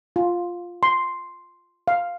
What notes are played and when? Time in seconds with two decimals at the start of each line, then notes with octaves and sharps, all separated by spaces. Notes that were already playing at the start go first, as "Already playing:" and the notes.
0.16 F4
0.83 C6
1.88 F5